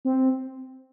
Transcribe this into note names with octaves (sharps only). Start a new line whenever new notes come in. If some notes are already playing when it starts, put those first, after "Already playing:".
C4